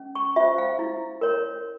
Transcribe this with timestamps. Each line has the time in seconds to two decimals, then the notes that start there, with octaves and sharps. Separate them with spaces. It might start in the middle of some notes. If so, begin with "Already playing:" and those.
Already playing: C#4
0.15 C#6
0.36 F4 C5 E5
0.58 F5
0.79 E4
1.21 A#4 C#5